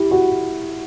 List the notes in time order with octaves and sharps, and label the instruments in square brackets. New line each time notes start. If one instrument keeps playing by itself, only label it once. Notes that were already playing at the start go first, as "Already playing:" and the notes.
Already playing: [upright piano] E4 G4
F#4